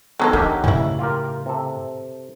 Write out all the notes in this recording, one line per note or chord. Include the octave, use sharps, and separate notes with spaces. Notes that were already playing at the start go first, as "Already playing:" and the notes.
D#3 F#3 G#3 B3 D#4 A4
D#3 F#3 A#3 D4 G4
A2 C#3 C#4 E4
F4 G4 A#4
C3 A4